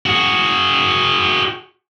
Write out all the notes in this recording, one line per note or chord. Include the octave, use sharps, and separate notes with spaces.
F#4 G#4